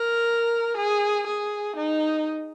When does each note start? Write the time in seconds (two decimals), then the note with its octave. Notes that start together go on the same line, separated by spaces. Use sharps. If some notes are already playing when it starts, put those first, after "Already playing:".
Already playing: A#4
0.78 G#4
1.27 G#4
1.77 D#4